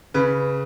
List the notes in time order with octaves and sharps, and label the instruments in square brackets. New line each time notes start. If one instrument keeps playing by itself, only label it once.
[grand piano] C#3 B4